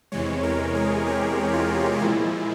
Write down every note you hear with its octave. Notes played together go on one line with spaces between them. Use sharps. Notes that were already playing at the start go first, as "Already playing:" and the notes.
E2 C3 E3 G#3 C#5
A#4
G#4
G4
F4
A#2 F3 G#3 E4